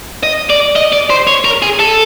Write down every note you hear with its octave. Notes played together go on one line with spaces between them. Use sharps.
D#5
D5
D#5
D5
C5
C#5
A#4
G#4
A4